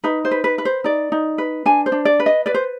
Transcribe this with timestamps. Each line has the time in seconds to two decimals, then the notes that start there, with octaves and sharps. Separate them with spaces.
0.04 D#4 B4
0.25 C5
0.31 B4
0.44 B4
0.58 B4
0.65 C5
0.84 D#4 D5
1.12 D#4
1.38 B4
1.66 D4 G#5
1.86 C5
1.92 D4
2.05 D5
2.20 B4
2.26 D#5
2.46 B4 D5
2.54 C5